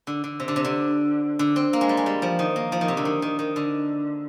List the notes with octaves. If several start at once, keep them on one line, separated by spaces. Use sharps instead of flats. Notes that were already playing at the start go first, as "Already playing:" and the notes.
D3
D3
C3
D3
C3
D3
D3
C4
A#3
G#3
G3
G#3
G3
F3
D#3
A#3
F3
D#3
C3
D3
D#3
D#3
D#3
D3